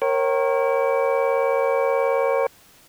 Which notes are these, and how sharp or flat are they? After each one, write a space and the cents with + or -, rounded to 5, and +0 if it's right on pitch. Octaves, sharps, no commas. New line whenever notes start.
A#4 +0 C#5 -30 G5 -35